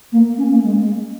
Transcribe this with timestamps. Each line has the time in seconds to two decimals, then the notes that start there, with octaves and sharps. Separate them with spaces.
0.12 A#3
0.37 C#4
0.49 A#3
0.63 G#3